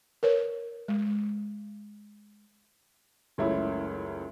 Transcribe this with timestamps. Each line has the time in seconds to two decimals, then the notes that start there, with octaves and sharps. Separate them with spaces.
0.23 A#4 B4 C#5
0.88 G#3
3.38 F#1 C#2 A3 E4 C#5